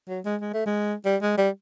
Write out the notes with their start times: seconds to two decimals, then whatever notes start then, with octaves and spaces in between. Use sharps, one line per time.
0.08 F#3
0.25 G#3
0.41 G#3
0.54 A3
0.66 G#3
1.05 G3
1.22 G#3
1.37 G3